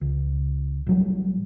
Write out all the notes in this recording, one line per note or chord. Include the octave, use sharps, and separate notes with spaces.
C#2
A1 F#3 G3